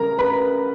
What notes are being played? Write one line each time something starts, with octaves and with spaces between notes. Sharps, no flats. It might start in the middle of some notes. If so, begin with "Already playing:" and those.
Already playing: C#3 G3 C#4 A#4 A#5
B4 B5